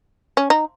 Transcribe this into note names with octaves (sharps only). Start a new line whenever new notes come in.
C#4
D#4